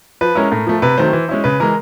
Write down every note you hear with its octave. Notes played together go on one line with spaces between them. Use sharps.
F3 B4
G#3 C#4 E4 A#4
A2
F3 A3
C3 B4
D#3 F#3 A3 C4 C5
E3
G#3 C#4 E4
C#3 B4
E3 G#3 A#4